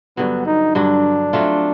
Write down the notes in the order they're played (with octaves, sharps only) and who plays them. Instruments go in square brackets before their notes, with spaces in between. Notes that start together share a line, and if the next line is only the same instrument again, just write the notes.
[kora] G2 D3 F#3 [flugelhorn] B3
[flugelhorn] D#4
[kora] G2 D3 F#3 [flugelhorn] D4
[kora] F#3 A3 C4 F4